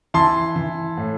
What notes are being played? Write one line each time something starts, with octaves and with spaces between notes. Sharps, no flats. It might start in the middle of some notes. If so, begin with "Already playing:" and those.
E3 A5 C6
E3
A2